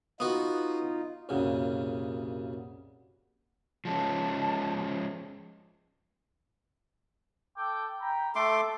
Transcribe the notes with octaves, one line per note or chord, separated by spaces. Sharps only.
B3 D#4 F4 F#4
C2 F#2 A#2 C#3
F3 G#3 C#4 A5
A4 G5 D6
G5 A#5 B5
A3 A4 C6 D6